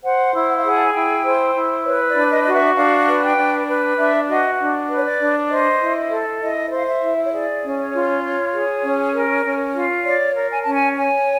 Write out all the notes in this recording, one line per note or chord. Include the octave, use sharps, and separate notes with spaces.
C5 F#5
E4
F#5
F5
G#4 F#5
A5
G#5
E4 G5
C5
E4
B4 C#5
D5
D4
D#5
F#4 D#5
E5
D4 F5
B4
G5
D4
B4
D4 E5
F#4 D#5
D4
B4
C#5
D5
D4
C5 D#5
E4
A4
E4 D#5
C5
F5
E5
E4
C#5
G#4 D5
C#4
C#5
F4
C#5
G#4
C#4
A#4
C#4
F4
C#5 D5
A#4
G#5
C#4 A5
G#5
C#5 G#5